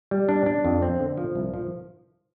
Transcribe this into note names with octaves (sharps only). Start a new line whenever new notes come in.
G3
D4
D4
F2
C4
D3
F3
C2
F3